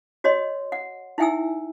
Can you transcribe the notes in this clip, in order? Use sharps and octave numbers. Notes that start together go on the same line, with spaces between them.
F#4 C#5 D#5 C6
F#5
D#4 E4 E5 G5 G#5 E6